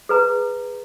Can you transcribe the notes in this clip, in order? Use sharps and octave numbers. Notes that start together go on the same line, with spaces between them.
G#4 B4 A#5